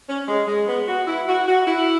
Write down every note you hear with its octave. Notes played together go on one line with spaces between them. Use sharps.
C#4
G#3
G#3
B3
F#4
E4
F#4
F#4
E4